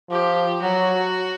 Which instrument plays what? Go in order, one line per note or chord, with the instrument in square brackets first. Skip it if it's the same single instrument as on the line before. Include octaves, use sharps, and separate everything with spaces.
[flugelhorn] F3 [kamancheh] G4
[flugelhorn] F#3 [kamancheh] F#4